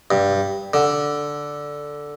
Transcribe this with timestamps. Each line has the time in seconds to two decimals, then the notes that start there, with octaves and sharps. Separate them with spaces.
0.11 G2
0.74 D3